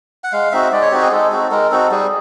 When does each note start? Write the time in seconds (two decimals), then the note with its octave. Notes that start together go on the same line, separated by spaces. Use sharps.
0.24 F#5
0.33 G#3 F5
0.52 C4 D#4 F#4 E5
0.72 G#3 D5
0.82 C#5
0.92 C4 D#4 F#4 G4
1.02 G#4
1.11 G#3 A4
1.32 C4 D#4 F#4
1.51 G#3 A#4
1.71 C4 D#4 F#4 A4
1.91 G3 G#4